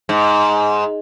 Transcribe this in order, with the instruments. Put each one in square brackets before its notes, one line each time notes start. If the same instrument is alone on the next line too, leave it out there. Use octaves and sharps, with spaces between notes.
[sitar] G#2